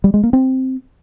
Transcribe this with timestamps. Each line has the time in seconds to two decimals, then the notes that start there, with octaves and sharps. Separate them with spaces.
0.04 G3
0.14 G#3
0.23 A#3
0.33 C4